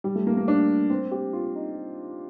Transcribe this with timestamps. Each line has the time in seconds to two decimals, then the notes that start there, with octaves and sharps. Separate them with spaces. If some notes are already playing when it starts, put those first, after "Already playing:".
0.04 G3
0.15 A3
0.27 A#3
0.37 A#3
0.48 D4
0.90 C4
1.11 G4
1.33 F4
1.56 D#4